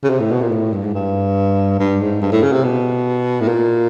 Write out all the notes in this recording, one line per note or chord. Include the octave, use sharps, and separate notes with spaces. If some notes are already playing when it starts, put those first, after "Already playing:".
C#3
C3
A2
B2
A#2
A2
G2
G#2
G2
G2
G#2
G2
A2
C#3
C3
B2
A2
A#2